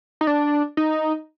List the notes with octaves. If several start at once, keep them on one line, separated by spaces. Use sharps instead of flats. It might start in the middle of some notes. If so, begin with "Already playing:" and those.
D#4
D4
D#4